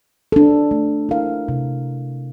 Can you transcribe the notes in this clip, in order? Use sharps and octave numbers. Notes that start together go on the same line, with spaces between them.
D4 A4
A3
E4 A#4 F5
C3